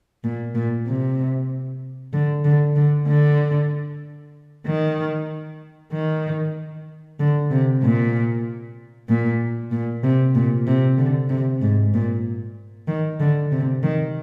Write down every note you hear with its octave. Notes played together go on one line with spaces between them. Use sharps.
A#2
A#2
C3
D3
D3
D3
D3
D#3
D#3
D3
C3
A#2
A#2
A#2
C3
A#2
C3
D3
C3
G#2
A#2
D#3
D3
C3
D#3